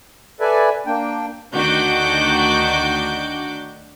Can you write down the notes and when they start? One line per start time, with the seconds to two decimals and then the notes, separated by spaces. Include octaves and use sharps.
0.40 A4 B4 D5 E5 G#5
0.86 A#3 D4 G5
1.53 D2 D#3 D4 F#4 D6 G6